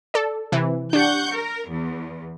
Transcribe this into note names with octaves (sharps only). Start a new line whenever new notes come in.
A4 D5
C3 E3
D4 G4 F#5 C#6 G6
A#4
E2